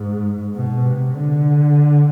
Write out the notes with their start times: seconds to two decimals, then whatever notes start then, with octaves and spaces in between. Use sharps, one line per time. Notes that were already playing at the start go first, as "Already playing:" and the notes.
Already playing: G#2
0.55 B2
0.85 C3
1.15 D3